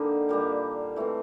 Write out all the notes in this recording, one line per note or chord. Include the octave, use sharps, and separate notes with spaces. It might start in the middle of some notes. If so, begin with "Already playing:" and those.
Already playing: D3 G3 A#3 D#4
A#2 G3 A#3
E3 A3 C4